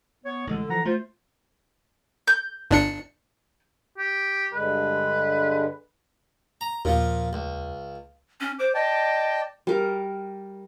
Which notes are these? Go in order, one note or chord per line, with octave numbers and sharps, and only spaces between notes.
B3 C#5
A1 D3 G#3
E3 F3 A4 F#5 A#5
A3 F4 C5
G6
G1 D4 C#7
G4
G2 D3 G#3 B4
A#5
D#2 A#2 F3
C#2
C#4
C5 D6
D5 D#5 G5 A5
G3 A#4